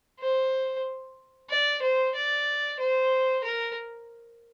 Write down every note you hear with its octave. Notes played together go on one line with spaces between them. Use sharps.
C5
D5
C5
D5
C5
A#4